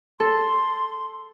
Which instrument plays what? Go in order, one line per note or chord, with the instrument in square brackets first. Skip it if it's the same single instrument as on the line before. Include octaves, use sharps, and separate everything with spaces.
[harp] A4 [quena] C6